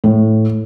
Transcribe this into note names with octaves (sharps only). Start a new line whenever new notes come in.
A2